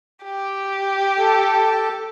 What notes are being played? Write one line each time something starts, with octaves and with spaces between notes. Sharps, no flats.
G4
A4